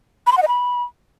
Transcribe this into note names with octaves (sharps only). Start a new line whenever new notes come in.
B5
C6
F#5
D#5
B5